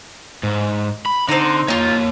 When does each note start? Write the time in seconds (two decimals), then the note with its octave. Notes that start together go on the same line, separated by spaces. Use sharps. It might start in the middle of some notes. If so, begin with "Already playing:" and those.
0.43 G#2
1.06 B5
1.28 D3 C4 D#4
1.68 A#3 D#4 F4 C#5